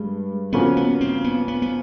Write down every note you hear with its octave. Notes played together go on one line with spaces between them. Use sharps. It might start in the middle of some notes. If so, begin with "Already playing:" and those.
Already playing: G2 G#3
C#3 F3 A#3 B3 C#4 F#4
B3
C4
B3
B3
B3